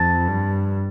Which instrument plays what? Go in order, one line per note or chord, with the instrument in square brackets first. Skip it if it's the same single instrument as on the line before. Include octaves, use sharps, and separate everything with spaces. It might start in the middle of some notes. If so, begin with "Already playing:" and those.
Already playing: [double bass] F2 [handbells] A5 A6
[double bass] G2